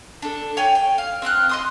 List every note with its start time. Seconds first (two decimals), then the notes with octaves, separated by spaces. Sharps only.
0.22 D4 A4
0.57 C#5 G5 G#5
0.75 G5
0.98 F5
1.22 C4 G5 F6 F#6
1.49 D#5 C6 D#6